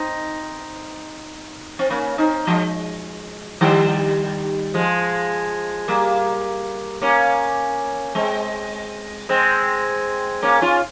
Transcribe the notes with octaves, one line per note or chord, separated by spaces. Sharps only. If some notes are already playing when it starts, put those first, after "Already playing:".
Already playing: C4 D#4
C4
A#3 C#4
C4 D#4
F3 G#3
D#3 G3
F3 G#3
G3 A#3
A#3 C#4
G#3 C4
G#3 C4
A#3 C#4
C#4 F4